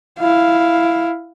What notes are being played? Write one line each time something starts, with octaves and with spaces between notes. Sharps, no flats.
E4 F5